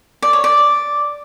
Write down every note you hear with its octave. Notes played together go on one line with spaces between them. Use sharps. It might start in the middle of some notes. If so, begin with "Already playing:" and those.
D5
C#5
D5